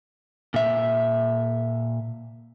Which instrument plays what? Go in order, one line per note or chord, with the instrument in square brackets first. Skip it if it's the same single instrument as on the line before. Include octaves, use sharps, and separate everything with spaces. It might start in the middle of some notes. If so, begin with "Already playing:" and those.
[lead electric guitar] A#2 E5